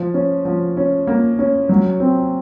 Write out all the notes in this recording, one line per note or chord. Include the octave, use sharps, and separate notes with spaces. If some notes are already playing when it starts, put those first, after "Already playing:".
Already playing: F3
C#4
F3
C#4
A#3
C#4
F#3
C4